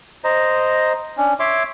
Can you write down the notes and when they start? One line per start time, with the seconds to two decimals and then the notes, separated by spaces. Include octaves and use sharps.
0.24 C5 D#5 A#5
1.17 C#4 D4
1.40 C#5 E5 C6 D6